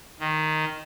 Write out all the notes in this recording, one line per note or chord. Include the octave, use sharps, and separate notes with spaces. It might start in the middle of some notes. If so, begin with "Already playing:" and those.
D#3